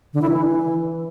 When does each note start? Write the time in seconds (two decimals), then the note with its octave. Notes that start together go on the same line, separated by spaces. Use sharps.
0.14 D3
0.22 E4
0.30 E3